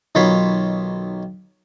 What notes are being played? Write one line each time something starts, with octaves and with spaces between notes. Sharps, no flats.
B1 D#3 F4 C#5 B5 C6